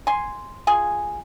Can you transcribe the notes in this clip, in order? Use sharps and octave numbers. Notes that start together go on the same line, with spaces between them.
G#5 C6
F4 G#4 G#5